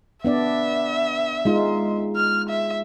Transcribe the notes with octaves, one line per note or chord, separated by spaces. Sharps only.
B3 D4 D5 E5
G#3 D#4 F4
F6
E5